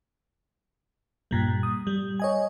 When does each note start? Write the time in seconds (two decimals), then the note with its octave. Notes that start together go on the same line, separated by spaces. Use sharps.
1.31 G2 A#2 G3
1.63 D#6
1.87 G3
2.20 C#5 D#5 G#5